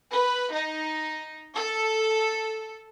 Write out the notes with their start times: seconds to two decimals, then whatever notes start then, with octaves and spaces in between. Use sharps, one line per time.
0.13 B4
0.53 D#4
1.54 A4